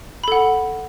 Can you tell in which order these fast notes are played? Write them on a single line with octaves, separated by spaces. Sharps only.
B5 A4 F#5